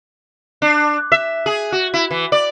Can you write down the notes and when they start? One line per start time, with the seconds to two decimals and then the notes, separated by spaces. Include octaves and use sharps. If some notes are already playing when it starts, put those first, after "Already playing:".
0.62 D4
1.12 E5
1.46 G#4
1.72 F#4
1.94 E4
2.11 E3
2.32 D5